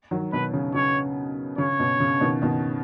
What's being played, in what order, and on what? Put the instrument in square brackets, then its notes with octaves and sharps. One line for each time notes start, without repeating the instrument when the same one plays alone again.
[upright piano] D#3 F#3
[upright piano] B2 D#3 [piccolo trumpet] B4
[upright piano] C#3
[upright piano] C#3 [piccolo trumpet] C#5
[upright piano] C#3 [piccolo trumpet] C#5
[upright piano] B2
C#3
B2 D#3
B2 D#3